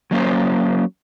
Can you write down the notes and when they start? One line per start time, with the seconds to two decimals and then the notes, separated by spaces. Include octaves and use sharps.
0.11 F#3 A#3 C#4 C5